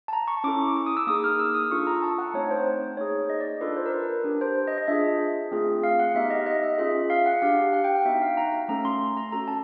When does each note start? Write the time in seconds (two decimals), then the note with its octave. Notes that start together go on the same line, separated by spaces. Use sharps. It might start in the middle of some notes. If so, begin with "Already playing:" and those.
0.08 A5
0.13 A#5
0.28 C#6
0.44 C#4 E4 A4 D6
0.76 D6
0.86 D#6
0.97 E6
1.07 A#3 D#4 G#4 D#6
1.24 F6
1.39 E6
1.54 D#6
1.71 D4 F4 A4 C#6
1.87 A#5
2.03 A5
2.18 F#5
2.34 A3 C4 D#4 C#5
2.51 C5
2.97 A#3 D#4 G#4 C#5
3.30 D#5
3.41 D5
3.61 D4 F4 A4 B4
3.77 C5
3.86 A#4
3.93 B4
4.24 D4 G4
4.41 C5
4.67 D#5
4.78 D#5
4.88 D4 F4 G#4 E5
5.51 A3 C4 F4 G#4
5.83 F5
5.99 F#5
6.14 B3 D#4 G4 E5
6.30 D#5
6.46 D#5
6.63 E5
6.78 C#4 F4 G#4 E5
7.10 F5
7.26 F#5
7.42 D4 G4 F5
7.73 F#5
7.84 G5
7.95 F#5
8.05 B3 D#4 F#4 E5
8.22 F5
8.37 A#5
8.68 A3 C#4 F#4 A4 A#5
8.85 C6
9.17 A#5
9.32 C#4 F#4 A4 A#5
9.48 A5